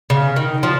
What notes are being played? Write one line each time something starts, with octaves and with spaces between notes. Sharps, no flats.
C#3
D#3
F3